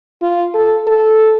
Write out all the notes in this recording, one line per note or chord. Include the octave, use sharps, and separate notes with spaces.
F4
A4
A4